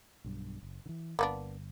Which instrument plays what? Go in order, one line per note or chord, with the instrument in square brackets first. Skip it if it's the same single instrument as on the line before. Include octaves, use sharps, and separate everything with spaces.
[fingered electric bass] B1 G2
F#1
D3 E3
[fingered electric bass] G1 [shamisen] A#3 B3 D4